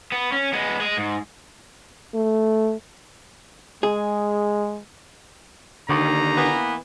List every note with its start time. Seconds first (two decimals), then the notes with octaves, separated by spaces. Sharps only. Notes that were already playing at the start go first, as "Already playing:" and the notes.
0.12 B3
0.32 C#4
0.53 G#3 B3
0.80 G#3 G#4
0.97 G#2
2.14 A3
3.83 G#3 G#4
5.89 D#2 D3 D#3 A#5
6.36 E3 A#3 B3